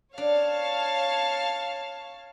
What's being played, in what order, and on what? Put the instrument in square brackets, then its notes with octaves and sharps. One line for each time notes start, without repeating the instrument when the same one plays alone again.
[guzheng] D4 [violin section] C#5 F5 A5